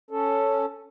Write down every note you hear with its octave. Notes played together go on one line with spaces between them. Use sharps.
C#4 A4